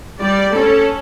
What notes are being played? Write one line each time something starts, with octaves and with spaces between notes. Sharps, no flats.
G3 D5
C#4 A4